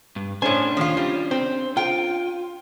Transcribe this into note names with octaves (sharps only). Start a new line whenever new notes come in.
G2
A2 C#4 D4 C5 C#5 G#5
D#2 F3 F4
G3 F4
C4 C5
F4 G5